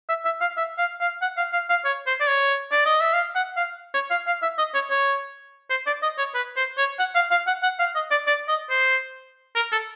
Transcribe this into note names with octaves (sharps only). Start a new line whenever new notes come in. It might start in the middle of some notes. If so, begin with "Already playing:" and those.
E5
E5
F5
E5
F5
F5
F#5
F5
F5
F5
C#5
C5
D5
C#5
D5
D#5
E5
F5
F#5
F5
C#5
F5
F5
E5
D#5
C#5
C#5
C5
D5
D#5
C#5
B4
C5
C#5
F#5
F5
F5
F#5
F#5
F5
D#5
D5
D5
D#5
C5
A#4
A4